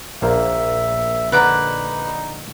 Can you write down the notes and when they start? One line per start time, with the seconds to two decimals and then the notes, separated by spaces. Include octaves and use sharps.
0.22 A#1 A#3 C5 E5
1.32 D3 D#4 B4 D5 A#5